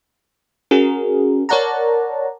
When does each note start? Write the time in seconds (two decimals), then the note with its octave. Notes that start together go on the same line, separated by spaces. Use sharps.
0.71 C#4 F#4 G#4 A#4
1.49 A#4 C#5 D5 F#5 A5 A#5